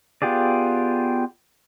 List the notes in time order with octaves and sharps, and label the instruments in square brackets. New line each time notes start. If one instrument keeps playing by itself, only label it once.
[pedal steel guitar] B3 F4 G4 G#4 D5